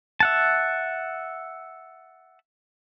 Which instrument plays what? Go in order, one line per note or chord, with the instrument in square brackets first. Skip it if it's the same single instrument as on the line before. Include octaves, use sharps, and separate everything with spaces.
[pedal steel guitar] E5 F#5 A5